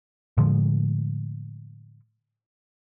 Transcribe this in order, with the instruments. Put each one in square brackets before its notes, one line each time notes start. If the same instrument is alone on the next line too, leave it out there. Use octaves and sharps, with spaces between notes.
[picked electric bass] A2 D3 F3 G#3